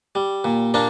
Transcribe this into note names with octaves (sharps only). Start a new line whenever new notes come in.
G3
A#2
A#2 A#3 D4